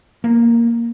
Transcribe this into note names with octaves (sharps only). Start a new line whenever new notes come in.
A#3